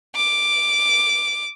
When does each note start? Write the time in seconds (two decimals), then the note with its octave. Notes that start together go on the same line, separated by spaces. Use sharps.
0.16 D6